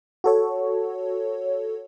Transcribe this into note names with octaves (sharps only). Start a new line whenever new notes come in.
F#4 A4 C#5